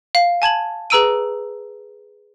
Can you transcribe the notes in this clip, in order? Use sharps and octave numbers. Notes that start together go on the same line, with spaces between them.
F5
G#5 A5 G#6 F#7
G#4 B4 A#5 E6 D7 D#7